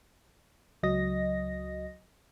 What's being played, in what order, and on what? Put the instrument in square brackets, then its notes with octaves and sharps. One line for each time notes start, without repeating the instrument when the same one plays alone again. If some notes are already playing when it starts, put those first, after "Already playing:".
[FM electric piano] C#2 F#3 D#5 A#6